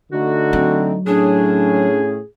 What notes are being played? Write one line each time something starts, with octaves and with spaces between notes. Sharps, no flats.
D3 A3 D#4 F#4
F#3 C4
A2 C#4 D4 G#4